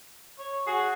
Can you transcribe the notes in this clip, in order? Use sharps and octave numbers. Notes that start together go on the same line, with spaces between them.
C#5
F#4 G#4